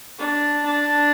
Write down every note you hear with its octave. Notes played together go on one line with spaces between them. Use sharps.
D4
D4